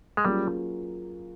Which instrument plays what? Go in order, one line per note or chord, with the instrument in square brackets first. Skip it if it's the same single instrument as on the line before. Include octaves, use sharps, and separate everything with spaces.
[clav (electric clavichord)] G#3
[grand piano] F#3 A#3 C#4 F4 G#4 [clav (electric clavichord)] G3